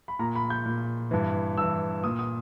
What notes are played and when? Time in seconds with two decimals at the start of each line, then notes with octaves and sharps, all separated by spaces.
0.08 B5
0.19 A#2 A#5
0.35 B5
0.50 G6
0.66 A#2
1.11 G2 E3
1.57 G2 E3 E6
2.04 A#2 D#6
2.19 D#6